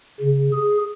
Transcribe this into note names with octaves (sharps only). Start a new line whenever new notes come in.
C#3
G#4